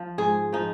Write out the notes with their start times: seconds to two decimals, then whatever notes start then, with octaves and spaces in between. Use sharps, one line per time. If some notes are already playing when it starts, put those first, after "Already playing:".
Already playing: F3
0.18 G#2 G#4
0.52 F3 D#4